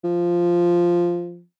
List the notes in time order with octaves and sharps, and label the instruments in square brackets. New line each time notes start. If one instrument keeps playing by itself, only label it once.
[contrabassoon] F3